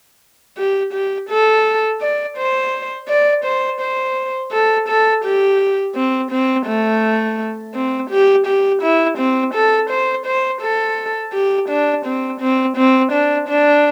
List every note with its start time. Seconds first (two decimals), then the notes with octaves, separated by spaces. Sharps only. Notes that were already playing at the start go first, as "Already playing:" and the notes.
0.58 G4
0.93 G4
1.30 A4
2.01 D5
2.38 C5
3.09 D5
3.45 C5
3.81 C5
4.52 A4
4.89 A4
5.24 G4
5.96 C4
6.32 C4
6.67 A3
7.75 C4
8.10 G4
8.47 G4
8.82 E4
9.18 C4
9.55 A4
9.90 C5
10.26 C5
10.62 A4
11.34 G4
11.69 D4
12.06 C4
12.41 C4
12.77 C4
13.12 D4
13.49 D4